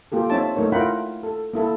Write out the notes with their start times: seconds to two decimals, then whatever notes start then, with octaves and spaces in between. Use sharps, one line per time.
0.12 A#3 F4 G4 A4
0.30 C4 D#4 C#5 E5 A5
0.56 A3 D#4 A#4 C#5
0.72 E4 F4 A#4 F#5 G5 B5
1.23 A4
1.53 A#3 E4 A4